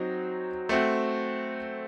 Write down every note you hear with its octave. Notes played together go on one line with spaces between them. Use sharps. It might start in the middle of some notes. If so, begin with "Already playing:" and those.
Already playing: F#3 C4 D#4
A3 C4 F#4